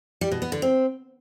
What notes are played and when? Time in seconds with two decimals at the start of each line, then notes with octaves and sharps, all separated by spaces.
0.21 G3
0.32 B2
0.42 B3
0.52 D3
0.62 C4